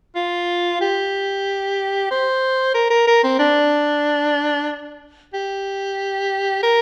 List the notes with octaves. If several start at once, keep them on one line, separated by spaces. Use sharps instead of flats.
F4
G4
C5
A#4
A#4
A#4
C4
D4
G4
A#4